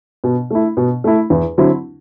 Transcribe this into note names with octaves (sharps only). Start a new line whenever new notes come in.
B2
A3 E4
B2
A3 E4
E2
D3 F#3 C4 E4